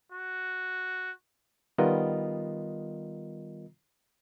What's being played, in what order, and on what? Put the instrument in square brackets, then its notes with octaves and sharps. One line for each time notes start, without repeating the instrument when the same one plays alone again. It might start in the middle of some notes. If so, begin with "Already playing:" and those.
[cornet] F#4
[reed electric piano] D#3 G3 B3 F4 A#4 D#5